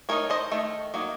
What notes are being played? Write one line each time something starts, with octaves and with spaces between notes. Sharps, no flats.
A3 D#4 A#4 C#5
C5 D#5
D#3 A3
F#3 A#3 D#4